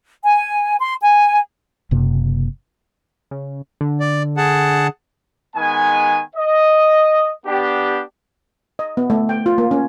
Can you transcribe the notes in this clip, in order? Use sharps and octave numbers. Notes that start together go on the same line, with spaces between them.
G#5
C6
G#5
F#1 F#2 C3 A#3
C#3
D3
D5
G#4 F#5 A5
D#3 G#3 B3 G#5
D#5
B3 D4 G4
D#5
B3
A3
G5
F4
A#3
C#4